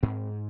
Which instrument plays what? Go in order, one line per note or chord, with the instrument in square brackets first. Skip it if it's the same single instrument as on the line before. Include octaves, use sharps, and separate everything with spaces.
[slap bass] G#2 C4